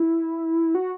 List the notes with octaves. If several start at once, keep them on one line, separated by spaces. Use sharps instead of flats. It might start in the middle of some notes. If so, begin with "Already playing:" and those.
Already playing: E4
F#4